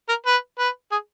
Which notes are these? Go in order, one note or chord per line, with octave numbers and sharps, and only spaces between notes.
A#4
B4
B4
G#4